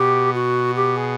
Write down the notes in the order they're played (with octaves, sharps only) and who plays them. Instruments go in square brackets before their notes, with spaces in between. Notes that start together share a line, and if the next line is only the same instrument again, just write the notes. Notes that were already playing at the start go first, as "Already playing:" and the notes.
Already playing: [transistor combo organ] B2 [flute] G4
[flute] F#4
G4
G#4